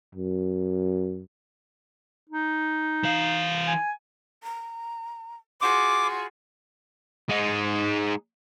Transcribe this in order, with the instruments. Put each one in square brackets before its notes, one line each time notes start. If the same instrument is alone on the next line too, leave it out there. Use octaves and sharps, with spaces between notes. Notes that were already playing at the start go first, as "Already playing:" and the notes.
[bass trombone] F#2
[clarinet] D#4
[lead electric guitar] E3 F5
[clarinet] G#5
[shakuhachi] A#5
[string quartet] F4 F#4 G#4 [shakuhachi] C6 [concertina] D6
[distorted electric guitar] G#3 D#4